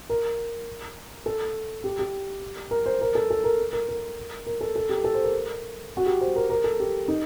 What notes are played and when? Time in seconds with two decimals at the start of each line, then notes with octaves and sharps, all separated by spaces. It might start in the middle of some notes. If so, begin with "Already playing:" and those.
0.10 A#4
1.26 A4
1.84 G4
1.99 G4
2.71 A#4
2.86 C5
3.01 A#4
3.15 A4
3.30 A4
3.44 A#4
3.73 A#4
3.89 A#4
4.47 A#4
4.61 A4
4.76 A4
4.89 G4
5.04 A4
5.14 C5
5.24 A#4
5.97 F#4
6.06 G4
6.21 C5
6.36 A#4
6.50 A#4
6.64 A4
6.80 G4
7.08 D#4